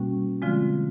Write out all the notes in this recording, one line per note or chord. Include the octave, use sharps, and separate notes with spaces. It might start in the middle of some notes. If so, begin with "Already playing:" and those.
Already playing: B2 G3 A#3 C#4 F#4
D3 F3 G#3 C4 F4